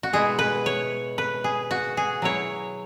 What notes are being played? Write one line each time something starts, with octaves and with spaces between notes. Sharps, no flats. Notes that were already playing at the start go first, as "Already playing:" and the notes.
F#4
B2 G#3 E4 G#4
B4
C#5
B4
G#4
F#4
G#4
F#3 E4 C#5